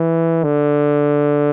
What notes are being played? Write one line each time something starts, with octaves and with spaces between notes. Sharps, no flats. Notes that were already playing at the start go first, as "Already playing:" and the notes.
Already playing: E3
D3